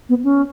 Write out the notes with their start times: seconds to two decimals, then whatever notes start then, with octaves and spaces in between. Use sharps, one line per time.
0.09 B3
0.24 C#4